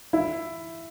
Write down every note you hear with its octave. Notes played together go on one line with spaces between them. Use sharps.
E4